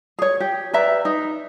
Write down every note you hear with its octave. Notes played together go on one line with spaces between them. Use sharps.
G#4 C#5
G4
B4 D5 E5 A#5
D#4